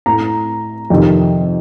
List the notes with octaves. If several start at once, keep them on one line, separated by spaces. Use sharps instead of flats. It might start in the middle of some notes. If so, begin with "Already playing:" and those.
A2 A#5
F2 C3 D#3